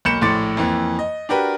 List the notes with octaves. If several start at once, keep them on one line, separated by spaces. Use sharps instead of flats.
B1 A#3 B5 G6 C#7 E7
A#1 A2 C6 D6 A6
F2 E3 A#3
D#5
D4 F#4 G4 A#4 B4